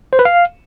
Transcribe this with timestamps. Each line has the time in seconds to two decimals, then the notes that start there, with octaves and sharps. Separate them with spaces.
0.13 C5
0.19 B4
0.25 F5